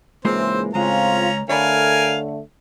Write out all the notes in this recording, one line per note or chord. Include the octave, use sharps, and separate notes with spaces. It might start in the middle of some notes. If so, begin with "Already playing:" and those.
G#2 C#3 E3 G#3 A#3 C4 F4 C5
C#2 A2 G#3 C4 C#4 F4 A#5
D3 A3 A#4 C#5 D5 F5 G#5 B5